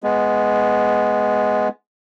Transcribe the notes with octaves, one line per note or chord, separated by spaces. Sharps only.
G#3 B3